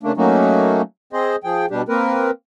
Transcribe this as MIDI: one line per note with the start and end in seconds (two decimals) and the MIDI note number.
0.03 0.12 49
0.03 0.12 57
0.03 0.12 58
0.03 0.12 62
0.17 0.82 54
0.17 0.82 57
0.17 0.82 58
0.17 0.82 61
0.17 0.82 63
0.17 0.82 66
1.13 1.36 60
1.13 1.36 68
1.13 1.36 72
1.13 1.36 75
1.44 1.66 53
1.44 1.66 68
1.44 1.66 79
1.71 1.82 47
1.71 1.82 55
1.71 1.82 62
1.71 1.82 67
1.89 2.31 58
1.89 2.31 60
1.89 2.31 70
1.89 2.31 71